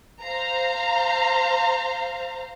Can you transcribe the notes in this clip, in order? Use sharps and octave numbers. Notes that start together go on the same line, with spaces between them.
C5 F5 A#5